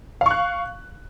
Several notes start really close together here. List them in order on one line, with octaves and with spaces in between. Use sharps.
F5 C#6 F#6